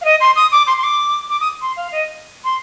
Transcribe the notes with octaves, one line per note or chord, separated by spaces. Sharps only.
F5
D#5
C6
D#6
D6
C6
C6
D6
D6
D#6
C6
F5
D#5
C6